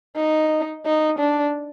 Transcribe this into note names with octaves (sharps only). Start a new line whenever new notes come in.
D#4
D#4
D4